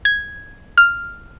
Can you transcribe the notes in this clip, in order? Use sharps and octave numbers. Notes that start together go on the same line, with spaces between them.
G#6
F6